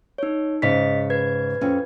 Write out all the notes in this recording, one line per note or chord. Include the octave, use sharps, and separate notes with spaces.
D#4 C#5
G#2 C#3 D#5 B6
B4 G#6
F2 C#4